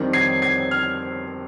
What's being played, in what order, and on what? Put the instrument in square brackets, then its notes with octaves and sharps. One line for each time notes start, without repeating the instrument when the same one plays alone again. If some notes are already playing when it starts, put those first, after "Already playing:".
Already playing: [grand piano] F2 D#3 G3
G#6 C7
G#6 C7
F6 G#6